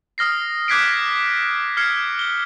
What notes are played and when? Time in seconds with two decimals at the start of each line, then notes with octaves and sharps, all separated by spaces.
0.18 D#6 F6 A#6 C7
0.68 D6 F#6 G#6 B6 C7 D7
1.77 F6 G#6 C7 C#7
2.19 G7